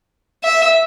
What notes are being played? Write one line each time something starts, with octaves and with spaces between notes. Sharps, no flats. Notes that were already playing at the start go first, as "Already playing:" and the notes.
E5